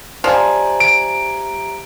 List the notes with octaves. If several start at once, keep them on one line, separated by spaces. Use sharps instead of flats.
F3 G4 D5 E5 G#5 A#5
D7